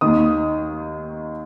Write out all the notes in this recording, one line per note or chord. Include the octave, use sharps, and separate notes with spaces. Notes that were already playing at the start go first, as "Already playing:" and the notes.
D#2 D#3 D#6